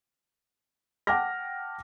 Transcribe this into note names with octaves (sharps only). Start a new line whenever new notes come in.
F#5 G5 A5 D6 F6 A#6